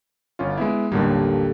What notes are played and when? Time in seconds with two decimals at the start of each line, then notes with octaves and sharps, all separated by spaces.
0.39 G1 C#4 F4
0.57 G#3 B3 E4
0.92 A1 D#2 D3 G3 A#3